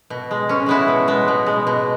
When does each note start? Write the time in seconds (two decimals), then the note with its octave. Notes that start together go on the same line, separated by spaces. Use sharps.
0.10 B2
0.31 G#3
0.49 B2 C#4
0.66 G#3 B3 E4
0.88 B2
1.08 G#3 B3
1.28 B2
1.46 G#3
1.67 B2